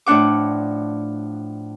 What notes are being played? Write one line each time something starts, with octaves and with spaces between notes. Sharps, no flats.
A2 F3 D4 F#5 D6